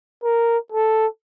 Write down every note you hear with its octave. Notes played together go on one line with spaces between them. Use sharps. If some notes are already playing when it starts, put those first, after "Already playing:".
A#4
A4